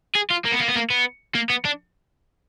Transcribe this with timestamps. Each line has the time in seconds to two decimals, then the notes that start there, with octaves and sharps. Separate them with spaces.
0.15 G#4
0.31 F4
0.45 A#3
0.53 B3
0.60 A#3
0.68 B3
0.76 A#3
0.90 B3
1.35 A#3
1.50 B3
1.65 D4